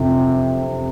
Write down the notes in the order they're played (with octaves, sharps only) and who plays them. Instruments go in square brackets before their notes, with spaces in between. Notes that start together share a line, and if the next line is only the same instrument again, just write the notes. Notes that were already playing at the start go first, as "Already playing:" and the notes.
Already playing: [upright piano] F2 C3